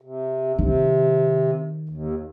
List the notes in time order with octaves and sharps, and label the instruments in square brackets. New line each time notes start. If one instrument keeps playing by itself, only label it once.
[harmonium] C3
[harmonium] C3 [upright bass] D#3
[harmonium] D#2